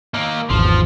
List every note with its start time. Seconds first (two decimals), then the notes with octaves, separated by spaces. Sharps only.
0.14 A#3 D#4
0.50 G#1 E2 F3